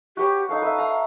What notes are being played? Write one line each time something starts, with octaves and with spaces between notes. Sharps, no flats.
F#4 G4 B4 C#5
D#4 A4 C#5 F5
B4 E5
A#5